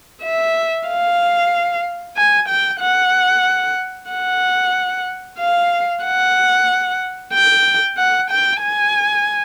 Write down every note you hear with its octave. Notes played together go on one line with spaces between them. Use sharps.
E5
F5
G#5
G5
F#5
F#5
F5
F#5
G5
F#5
G5
G#5